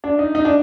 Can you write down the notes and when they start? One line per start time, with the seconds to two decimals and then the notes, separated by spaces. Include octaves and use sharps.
0.04 D4
0.19 D#4
0.35 D#4
0.45 D4